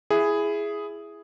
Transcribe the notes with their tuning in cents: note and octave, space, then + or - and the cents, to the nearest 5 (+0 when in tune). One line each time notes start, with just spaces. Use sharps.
E4 +10 G#4 +0